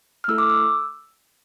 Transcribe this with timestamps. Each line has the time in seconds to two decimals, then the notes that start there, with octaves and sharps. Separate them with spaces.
0.24 F6
0.28 A3 E4 A4 E6
0.38 D6
0.50 E6